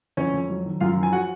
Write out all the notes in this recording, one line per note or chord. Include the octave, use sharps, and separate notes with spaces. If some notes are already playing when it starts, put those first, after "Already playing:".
F2 C#4 C#5
F2
F#3
D#3
F#2 F4 F5
F3
G#5
F#4 F#5